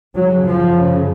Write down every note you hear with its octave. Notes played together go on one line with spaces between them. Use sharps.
F#2 C#3 F#3
F3
C#3